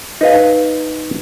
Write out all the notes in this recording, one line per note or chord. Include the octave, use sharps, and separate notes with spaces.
D#4 B4 F5